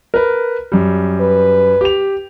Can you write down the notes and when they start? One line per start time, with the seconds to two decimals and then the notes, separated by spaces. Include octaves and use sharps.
0.14 A#4 B4
0.72 F#2 G3
1.20 B4
1.81 G4 F7